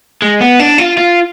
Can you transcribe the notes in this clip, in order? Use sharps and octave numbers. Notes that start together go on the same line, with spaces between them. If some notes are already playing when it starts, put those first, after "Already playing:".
G#3
B3
D4
F4
F4